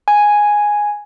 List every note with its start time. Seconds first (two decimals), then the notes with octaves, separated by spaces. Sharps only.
0.08 G#5